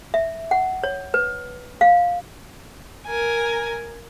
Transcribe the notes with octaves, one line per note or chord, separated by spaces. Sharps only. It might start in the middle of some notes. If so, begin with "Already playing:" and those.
E5
F#5
C#5
B4
F5
A#4 G#5